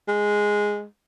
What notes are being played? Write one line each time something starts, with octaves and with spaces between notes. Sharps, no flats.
G#3